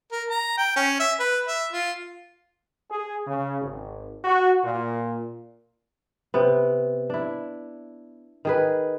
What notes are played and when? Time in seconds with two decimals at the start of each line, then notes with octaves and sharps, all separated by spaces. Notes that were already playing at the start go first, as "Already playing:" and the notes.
0.12 A#4
0.29 A#5
0.58 G5
0.76 C#4
1.00 E5
1.20 B4
1.48 E5
1.73 F4
2.91 G#4
3.27 C#3
3.62 G#1
4.25 F#4
4.64 A#2
6.34 C3 B3
7.10 D4 E4
8.45 D#3 G#4 B4